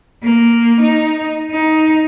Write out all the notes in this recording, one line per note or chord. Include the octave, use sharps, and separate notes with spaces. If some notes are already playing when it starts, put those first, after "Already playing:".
A#3
D#4
D#4